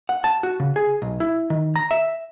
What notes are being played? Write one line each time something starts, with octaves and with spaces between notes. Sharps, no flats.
F#5
A5
F#4
C#3
G#4
B1
E4
D#3
A#5
E5